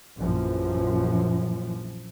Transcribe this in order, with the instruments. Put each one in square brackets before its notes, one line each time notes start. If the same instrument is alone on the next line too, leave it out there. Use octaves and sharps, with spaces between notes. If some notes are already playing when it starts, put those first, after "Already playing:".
[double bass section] A#1 F#2 E3 F3